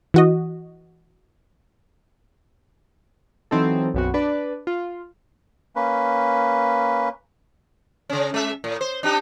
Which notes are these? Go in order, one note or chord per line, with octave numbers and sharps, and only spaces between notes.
E3 F#4 D#5
E3 F#3 C4 D#4 A4
B1 F#2 B3 C4 F#4
D4 B4 D5
F4
A#3 C#4 B4
C#3 C#4
G#3 E5
A2
C5
D4 D#4 G4